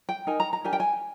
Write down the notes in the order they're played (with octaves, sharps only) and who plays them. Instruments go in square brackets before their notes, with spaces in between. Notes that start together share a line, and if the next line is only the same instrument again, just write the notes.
[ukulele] G5
D#4 A#4 G#5
A#5
A#5
D4 G4 A#4 G#5
G5
G#5